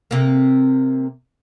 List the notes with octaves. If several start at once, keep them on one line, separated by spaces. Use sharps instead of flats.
C3 A#3